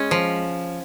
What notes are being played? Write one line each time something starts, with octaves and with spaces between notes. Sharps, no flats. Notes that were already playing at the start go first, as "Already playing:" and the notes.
Already playing: G#3 C#4
F3